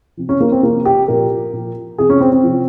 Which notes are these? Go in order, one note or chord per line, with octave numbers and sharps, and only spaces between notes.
C3 F3
C#4
A#3
C4
C3 F3 A#3
G4
A#2 F3 A#4
A#2 F3
C3 F3 G#4
C#4
C4
C4
C3 F3